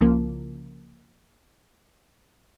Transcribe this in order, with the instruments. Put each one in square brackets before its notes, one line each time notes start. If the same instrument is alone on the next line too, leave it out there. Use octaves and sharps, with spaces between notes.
[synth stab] C2 C#3 F3 A#3